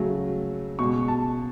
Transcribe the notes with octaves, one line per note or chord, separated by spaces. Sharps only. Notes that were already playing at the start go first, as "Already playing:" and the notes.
Already playing: C#3 F#3 A3
B2 G#3 C#6
A5